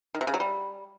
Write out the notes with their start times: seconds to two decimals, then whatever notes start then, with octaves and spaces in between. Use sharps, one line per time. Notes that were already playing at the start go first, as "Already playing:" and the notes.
0.15 D#3
0.21 C3
0.27 C#3
0.34 F#3
0.40 G3